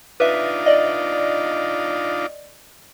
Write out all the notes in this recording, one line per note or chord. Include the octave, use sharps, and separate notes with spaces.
D4 D#4 F4 B4 E5
D5 D#5